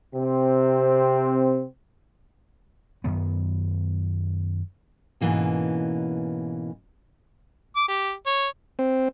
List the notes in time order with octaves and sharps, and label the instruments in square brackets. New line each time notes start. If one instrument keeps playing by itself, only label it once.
[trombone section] C3 C4
[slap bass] F#2 D#3 B3
[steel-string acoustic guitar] G#2 B2 E3 A#3 C#4
[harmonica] D6
G4
C#5
[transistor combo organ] C4